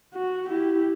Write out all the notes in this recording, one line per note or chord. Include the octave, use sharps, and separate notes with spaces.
F#4
E4 G4